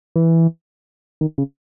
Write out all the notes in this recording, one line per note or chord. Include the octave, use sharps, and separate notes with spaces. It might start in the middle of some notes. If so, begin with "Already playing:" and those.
E3
D#3
C#3